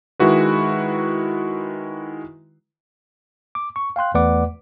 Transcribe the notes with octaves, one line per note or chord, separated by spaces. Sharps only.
D#3 G#3 E4 F#4 B4
D6
C#6
F5 G5 C6 F#6
E2 A3 B4 D5 F#5 D6